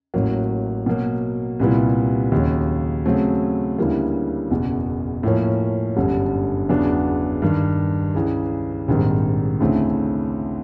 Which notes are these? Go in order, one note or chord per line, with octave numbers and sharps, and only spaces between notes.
A1 A2 F#3 A#3
B2 F#3 A#3
C2 A#2 G3 B3 E4
D#2 C#3 F#3
C#3 F#3 A3 C4
D2 C#3 E3 G3 A#3
F#1 E2 B2
A2 F3 A#3 C#4
G1 F#2 D3 G3
E2 C#3 F#3 B3 D4
G2 D#3 G3
C#2 C#3 E3
A#1 G#2 D#3 G3 C4
D2 C#3 E3 A3 C4